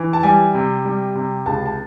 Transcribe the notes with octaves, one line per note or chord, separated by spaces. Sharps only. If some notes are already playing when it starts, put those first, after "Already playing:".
Already playing: E3
A5
G3 G#5
C3
G3
C3
C#2 A5
A5